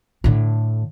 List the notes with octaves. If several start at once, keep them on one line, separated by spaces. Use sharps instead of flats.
A2 D3